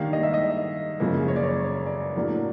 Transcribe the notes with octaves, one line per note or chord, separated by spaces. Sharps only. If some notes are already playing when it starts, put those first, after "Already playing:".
Already playing: D#3 G3 A#3 D4 F5
D#5
E5
D#5
F#2 C#3 F3 A#3
C#5
D5
C#5
D5
A2 F#3 A#3 D4